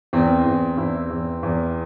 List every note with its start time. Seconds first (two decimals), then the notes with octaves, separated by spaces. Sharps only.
0.13 E2 C4
0.45 E2
0.77 E2 E4
1.10 E2
1.43 E2